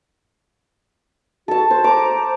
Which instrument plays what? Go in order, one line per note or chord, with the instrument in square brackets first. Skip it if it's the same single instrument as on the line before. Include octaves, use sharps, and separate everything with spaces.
[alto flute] F#4 [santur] A4 A5
[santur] C5 [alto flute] A5
[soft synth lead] A#5 [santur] D6
[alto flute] C5